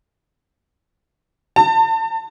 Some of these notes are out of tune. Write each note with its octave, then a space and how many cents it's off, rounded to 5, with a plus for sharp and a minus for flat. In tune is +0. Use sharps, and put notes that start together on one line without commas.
A5 +30